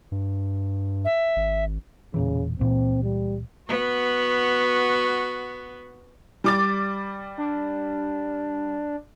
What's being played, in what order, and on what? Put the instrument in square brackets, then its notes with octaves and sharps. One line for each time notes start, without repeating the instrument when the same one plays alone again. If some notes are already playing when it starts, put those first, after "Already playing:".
[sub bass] G2
[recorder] E5
[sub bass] G#1
[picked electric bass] E1 A#2 E3 [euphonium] C#3
[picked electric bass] C#2 A#2 E3 [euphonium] C4
[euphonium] G3
[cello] B3 F#4
[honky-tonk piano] G3 D6 A6
[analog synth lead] D4